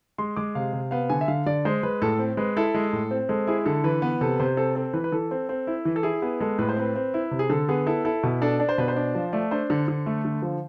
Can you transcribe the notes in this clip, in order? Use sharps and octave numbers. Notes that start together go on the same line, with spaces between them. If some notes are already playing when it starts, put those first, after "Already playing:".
G#3 C6
G#3 D6
C3 F5
C3
B3 F5
D3 G#5
E5
D3 F5
D3 D5
G#3 C5
G#3 B4
A2 A4
C4
G#3 B4
E4 A4
G#3
A2
C4
G#3 A4
E4 G#4
D3 A4
E3 B4
B3
C3 A4
C3 C5
C4 A4
C4 A4
E3 B4
B4
E3 A4
C4
C4
E4
E3
A4
E4 G#4
B3 G#4
G#3 A4
A2 B4
C5
C4 B4
C4
E4
C3
G#4
D3 A4
B3 G#4
E4 A4
E4 A4
B2
D4 A4
D4 D5
C5
B2 B4
C5
D4
F3
A3 D5
D4 C5
D3 C5
D3
A3
D3
F3